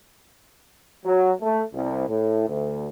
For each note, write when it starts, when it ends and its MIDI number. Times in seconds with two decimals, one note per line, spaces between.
1.05 1.31 54
1.41 1.61 57
1.74 2.06 36
2.09 2.47 45
2.48 2.89 38